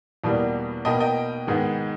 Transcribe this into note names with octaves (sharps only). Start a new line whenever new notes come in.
E2 B2 G3 A#3
B2 A#3 D#5 G5
D#5 G5
G#2 D#3 G#3 B3